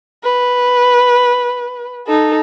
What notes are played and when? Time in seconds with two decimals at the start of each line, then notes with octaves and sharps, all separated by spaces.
0.24 B4
2.07 D#4 A4